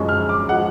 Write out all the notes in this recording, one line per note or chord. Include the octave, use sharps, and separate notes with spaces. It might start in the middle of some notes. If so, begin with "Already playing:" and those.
Already playing: F#2 F3 G#3 C#6
F6
D6
F3 G#3 F#5